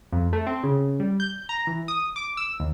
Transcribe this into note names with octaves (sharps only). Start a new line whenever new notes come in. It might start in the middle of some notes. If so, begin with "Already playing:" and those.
F2
A3
C4
C#3
G3
G6
A#5
E3
D#6
D6
E6
D#2